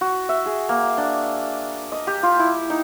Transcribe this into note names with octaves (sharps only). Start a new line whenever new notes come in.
F#4
E5
G#4
A#3
D4
D#5
G4
F4
E4
D#4